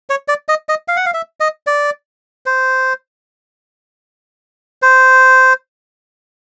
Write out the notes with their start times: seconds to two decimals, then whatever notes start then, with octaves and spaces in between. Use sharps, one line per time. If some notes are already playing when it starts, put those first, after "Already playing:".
0.10 C#5
0.28 D5
0.49 D#5
0.69 D#5
0.88 F5
0.97 F#5
1.06 F5
1.14 E5
1.40 D#5
1.67 D5
2.46 C5
4.82 C5